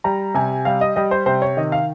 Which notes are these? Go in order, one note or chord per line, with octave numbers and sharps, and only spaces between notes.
G3 A#5
C3 G#5
G3 F5
D#5
G3 D#5
C5
C3 C5
C#5
D#3 D#5
F5